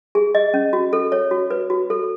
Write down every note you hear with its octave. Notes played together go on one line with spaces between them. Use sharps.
G#4
D#5
C#4
F#4
A4
C#5
F#4
B4
F#4
A4